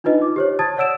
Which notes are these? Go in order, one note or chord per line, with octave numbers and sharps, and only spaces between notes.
D4 D#4 F4 B4 D#5
D6
G4 C5 C#5
A5 D#6 G#6 A6
C#5 D5 F#5 E6 D7 E7